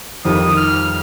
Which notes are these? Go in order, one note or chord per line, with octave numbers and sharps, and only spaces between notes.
F2 D#3 G3 D#6
F6